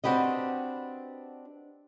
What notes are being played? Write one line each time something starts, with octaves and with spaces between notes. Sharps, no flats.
C4 D4 F#4 G4 B4 D#5